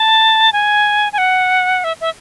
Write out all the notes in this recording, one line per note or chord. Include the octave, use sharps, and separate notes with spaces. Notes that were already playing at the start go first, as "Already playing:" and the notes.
Already playing: A5
G#5
G#5
F#5
E5
E5